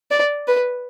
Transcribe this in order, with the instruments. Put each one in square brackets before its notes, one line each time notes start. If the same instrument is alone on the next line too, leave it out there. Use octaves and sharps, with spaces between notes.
[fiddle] D5
B4